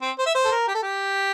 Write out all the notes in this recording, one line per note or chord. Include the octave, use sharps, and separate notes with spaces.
C4
C5
E5
C5
A4
A#4
G4
A4
G4